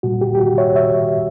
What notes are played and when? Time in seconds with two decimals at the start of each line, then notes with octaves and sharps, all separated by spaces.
0.03 A#2 G3 F#4
0.21 G4
0.35 G4
0.40 F#4
0.58 C#5 E5
0.76 C#5 E5